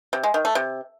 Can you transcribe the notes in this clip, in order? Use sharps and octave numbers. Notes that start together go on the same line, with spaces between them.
C3
G#3
D#3
A3
C3